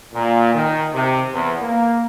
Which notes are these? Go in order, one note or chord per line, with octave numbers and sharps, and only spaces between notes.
A#2
D#3
C3
E2
A#3